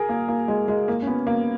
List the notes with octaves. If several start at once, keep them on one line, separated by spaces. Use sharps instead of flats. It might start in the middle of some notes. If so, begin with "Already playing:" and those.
Already playing: G#4 A#4
A#3
A#3
G#3
G#3
A#3
C#4
B3
A#3